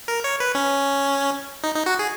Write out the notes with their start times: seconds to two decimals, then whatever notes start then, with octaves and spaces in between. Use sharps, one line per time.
0.08 A#4
0.24 C#5
0.40 B4
0.55 C#4
1.64 D#4
1.75 D#4
1.86 F#4
1.99 G#4